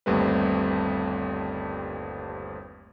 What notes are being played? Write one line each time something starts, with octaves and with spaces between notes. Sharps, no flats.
G1 D#2 G3 A3 C4 B4